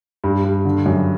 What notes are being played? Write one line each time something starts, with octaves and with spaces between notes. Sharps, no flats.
G2
G2
D3
F#2